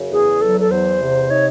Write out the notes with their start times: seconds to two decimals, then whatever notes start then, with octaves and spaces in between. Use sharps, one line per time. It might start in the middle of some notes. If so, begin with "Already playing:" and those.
Already playing: F#2 C#3
0.11 E2 G#4
0.41 F#3 A4
0.60 A4
0.71 E2 C5
1.00 C3
1.30 D#4 C#5